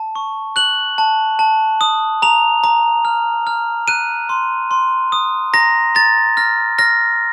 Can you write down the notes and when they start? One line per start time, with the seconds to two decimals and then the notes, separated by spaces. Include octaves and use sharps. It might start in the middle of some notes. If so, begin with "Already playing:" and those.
Already playing: A5
0.15 C#6
0.56 F#6 F#7
0.98 A5
1.39 A5
1.81 D#6
2.22 A#5 F7
2.64 A#5
3.05 F6
3.47 F6
3.88 F#6 D#7
4.29 C6
4.71 C6
5.12 D#6
5.53 A#5 A#6
5.95 A#5 A6
6.37 F6 A#6
6.78 F6 A#6